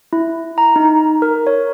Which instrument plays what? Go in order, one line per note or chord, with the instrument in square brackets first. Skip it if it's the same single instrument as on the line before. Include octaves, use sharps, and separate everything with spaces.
[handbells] E4
A#5
D#4
A#4
C#5